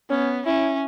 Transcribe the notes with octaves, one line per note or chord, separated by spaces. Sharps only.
B3 C#4
C#4 E4